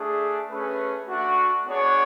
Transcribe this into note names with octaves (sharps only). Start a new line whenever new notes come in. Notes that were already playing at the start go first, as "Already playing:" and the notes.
Already playing: A3 D4 G#4
A3 C#4 G#4 B4
A3 D4 F#4
B3 D4 G#4 C#5 F#5